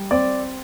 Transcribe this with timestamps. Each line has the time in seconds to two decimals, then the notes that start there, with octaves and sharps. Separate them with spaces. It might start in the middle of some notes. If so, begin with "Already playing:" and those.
Already playing: G3
0.11 C4 D5